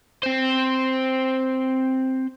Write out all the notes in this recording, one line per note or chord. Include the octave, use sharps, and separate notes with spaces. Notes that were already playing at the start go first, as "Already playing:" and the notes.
C4 C5